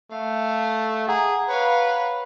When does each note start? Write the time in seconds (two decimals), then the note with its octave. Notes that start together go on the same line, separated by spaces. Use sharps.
0.11 A3 F5
1.08 G#4 F#5 A#5
1.49 B4 C#5 F5